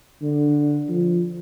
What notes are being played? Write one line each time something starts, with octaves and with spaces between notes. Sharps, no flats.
D3
F3